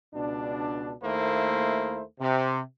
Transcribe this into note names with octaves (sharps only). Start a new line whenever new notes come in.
C#2 B2 D4
D#2 A3 A#3 E4 C5
C3